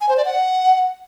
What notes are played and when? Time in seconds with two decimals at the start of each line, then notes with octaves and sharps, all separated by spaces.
0.01 G#5
0.09 C5
0.17 D5
0.25 F#5